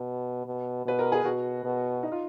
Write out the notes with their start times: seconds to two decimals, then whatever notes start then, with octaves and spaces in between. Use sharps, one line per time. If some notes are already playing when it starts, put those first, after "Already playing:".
Already playing: B2
0.46 B2
0.85 B2 B4
0.99 A#4
1.12 G#4
1.25 B2 F#4
1.64 B2
2.03 D#4
2.12 F4